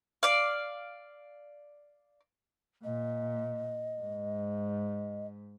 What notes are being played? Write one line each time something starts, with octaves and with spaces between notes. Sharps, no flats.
D5 F5
A#2 D#5
G#2